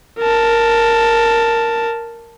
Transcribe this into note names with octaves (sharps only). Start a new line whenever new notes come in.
A#4 A5